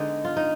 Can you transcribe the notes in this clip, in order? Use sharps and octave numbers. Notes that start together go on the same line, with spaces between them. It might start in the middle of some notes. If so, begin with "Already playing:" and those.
Already playing: D3 G#3 B3 D#4
F4
D#4